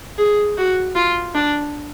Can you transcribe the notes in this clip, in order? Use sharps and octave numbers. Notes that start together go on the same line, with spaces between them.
G#4
F#4
F4
D4